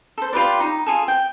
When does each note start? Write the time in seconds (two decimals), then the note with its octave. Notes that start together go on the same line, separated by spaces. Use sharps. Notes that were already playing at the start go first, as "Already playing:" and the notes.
0.18 A4 C5
0.33 F4 G4 B4 D5
0.60 D#4
0.86 F4 G#4 A4
1.08 G5